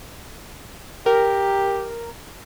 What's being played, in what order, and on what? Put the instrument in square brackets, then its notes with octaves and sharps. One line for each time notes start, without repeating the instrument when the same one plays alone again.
[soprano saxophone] G4 [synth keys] A#4